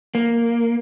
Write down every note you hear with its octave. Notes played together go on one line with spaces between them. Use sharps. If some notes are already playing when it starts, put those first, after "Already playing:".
A#3